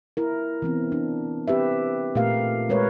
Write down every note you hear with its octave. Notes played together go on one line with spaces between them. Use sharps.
E4 A#4
E3 B3 C4
D4
C4 G4 B4 E5
A#2 A3 A#3 G4 A#4 F5
G#3 A#4 B4 C#5